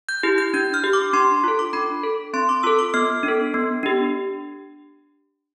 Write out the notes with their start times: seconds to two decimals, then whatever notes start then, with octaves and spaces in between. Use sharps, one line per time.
0.09 G6
0.23 E4 G4
0.38 G6
0.54 D4 G6
0.74 F6
0.84 G4
0.93 D6
1.13 D4 C6
1.44 F4 A4
1.59 D6
1.73 D4 B5
2.04 A4
2.34 C4 C6
2.49 D6
2.63 F4 A4 E6
2.79 D6
2.94 B3 F6
3.23 D4
3.28 A4
3.54 B3
3.83 D4 G4